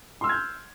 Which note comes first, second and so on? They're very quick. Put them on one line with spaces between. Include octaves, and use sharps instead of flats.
C6 E6 F6 G#6 G6